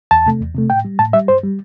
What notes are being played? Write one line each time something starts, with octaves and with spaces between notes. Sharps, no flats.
E2 A5
C3 A3
E2
C3 A3
A2 G5
G3
A2 A5
G3 E5
G2 C5
G3